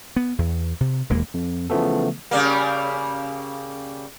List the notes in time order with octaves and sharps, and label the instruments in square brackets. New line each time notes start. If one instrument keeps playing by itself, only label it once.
[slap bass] B3
E2
C3
E1 D#2 G#3 A#3
[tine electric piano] F2
C#3 E3 F3 A3 B3 A4
[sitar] C#3 G3 A#3